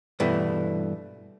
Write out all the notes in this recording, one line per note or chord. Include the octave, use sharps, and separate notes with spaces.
G2 B2 E3 A3